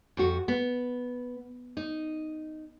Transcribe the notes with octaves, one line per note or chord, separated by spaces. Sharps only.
F2 F#4
B3
D#4